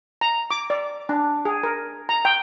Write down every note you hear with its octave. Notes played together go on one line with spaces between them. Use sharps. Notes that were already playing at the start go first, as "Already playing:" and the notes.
A#5
D6
D5
D4
G#4
A#4
A#5
G5